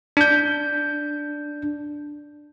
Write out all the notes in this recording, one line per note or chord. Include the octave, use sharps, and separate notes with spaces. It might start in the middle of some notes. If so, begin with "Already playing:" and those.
D4 G6